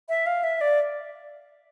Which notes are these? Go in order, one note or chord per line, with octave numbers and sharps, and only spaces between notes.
E5
F5
E5
D5